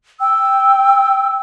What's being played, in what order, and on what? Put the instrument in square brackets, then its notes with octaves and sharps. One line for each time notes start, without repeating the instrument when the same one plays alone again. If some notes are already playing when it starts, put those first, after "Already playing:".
[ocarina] G5 [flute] E6